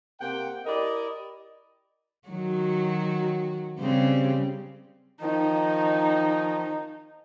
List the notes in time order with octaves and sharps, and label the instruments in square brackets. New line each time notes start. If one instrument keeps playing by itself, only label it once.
[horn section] C3 A#3 F#5 G5
E4 G4 A#4 D5 D#5
[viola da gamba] D#3 F#3 F#4
C#3 G3 C4
[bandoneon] D#3 F3 [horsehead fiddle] D#4